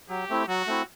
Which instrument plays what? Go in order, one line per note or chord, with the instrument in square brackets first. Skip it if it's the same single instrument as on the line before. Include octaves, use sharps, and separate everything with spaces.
[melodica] F#3 [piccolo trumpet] G4
[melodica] A3 C4 E4
[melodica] F#3 [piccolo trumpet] F#4
[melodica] A3 C4 E4